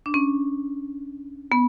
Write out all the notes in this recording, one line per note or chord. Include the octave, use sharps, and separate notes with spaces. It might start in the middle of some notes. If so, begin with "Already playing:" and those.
D4
C#4
B3